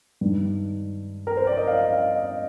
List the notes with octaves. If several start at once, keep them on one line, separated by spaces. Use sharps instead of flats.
G2 D#3
A#4
C5
D5
D#5
F5
F5
D#5